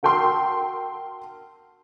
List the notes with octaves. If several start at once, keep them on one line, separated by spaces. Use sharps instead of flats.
F#4 A#4 G5 A5 C6 E6